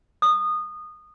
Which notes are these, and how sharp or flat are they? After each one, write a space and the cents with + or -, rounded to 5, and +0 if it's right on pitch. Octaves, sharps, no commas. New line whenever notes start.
D#6 -20